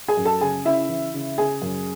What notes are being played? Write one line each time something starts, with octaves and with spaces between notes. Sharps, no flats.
G#4 G#5
F#2
A4 A5
C#3 G#4 G#5
C#3 E4 E5
E3
C#3
C#3 G#4 G#5
F#2